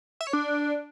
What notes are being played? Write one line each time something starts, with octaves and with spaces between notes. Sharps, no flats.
E5
C#5
D4